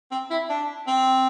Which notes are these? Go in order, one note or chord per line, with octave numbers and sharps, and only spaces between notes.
C4
E4
D4
C4